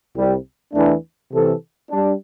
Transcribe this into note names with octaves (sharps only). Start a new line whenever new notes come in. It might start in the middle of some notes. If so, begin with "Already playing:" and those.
C2 C3 G3
E2 E3 A3 D4
C3 E3 C4 A4
G3 D4